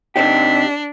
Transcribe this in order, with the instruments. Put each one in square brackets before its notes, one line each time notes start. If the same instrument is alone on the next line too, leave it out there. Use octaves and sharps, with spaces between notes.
[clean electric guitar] C3 D#4 G4 [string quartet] D4 [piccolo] B6